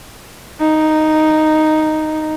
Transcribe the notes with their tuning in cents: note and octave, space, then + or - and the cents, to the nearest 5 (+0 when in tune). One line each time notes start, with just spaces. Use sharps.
D#4 -5